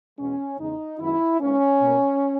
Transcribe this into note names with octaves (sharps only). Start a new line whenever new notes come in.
E2 B2 G#3 B3 C#4
E2 C#3 G#3 D#4
F#2 D#3 G#3 B3 E4
G#2 E3 A#3 C#4
B2 A#3